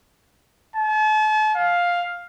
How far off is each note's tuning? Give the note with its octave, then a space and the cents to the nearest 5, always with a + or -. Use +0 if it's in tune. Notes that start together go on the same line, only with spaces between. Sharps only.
A5 -40
F5 +5